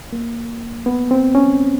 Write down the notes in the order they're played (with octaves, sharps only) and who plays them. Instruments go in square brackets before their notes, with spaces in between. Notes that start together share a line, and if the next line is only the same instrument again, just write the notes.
[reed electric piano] A#3
B3
C4
C#4